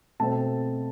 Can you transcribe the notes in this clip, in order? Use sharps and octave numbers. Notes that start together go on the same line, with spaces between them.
B2 A3 C4 A5